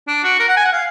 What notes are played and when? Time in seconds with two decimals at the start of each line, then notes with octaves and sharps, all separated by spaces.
0.08 D4
0.24 F#4
0.40 A#4
0.49 F#5
0.57 G#5
0.65 F#5
0.73 F5